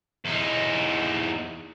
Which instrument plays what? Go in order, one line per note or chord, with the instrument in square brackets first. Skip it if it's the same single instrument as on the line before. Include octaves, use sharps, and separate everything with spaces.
[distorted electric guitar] E2 D#4